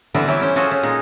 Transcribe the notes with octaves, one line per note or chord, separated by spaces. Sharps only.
D3 E3 G3 B3 C4
E3 F#3 G3 E4 G4
C#4 C5
C#4 F4 F#4 G#4 A4 C5
C#4
A#2 G#3 D#4